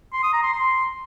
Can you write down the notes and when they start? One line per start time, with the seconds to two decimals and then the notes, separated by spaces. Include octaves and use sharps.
0.13 C6
0.23 D#6
0.33 A#5
0.43 C6
0.53 C6